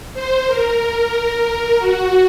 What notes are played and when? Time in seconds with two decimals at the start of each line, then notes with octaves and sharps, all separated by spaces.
0.14 C5
0.47 A#4
0.79 A#4
1.13 A#4
1.79 F#4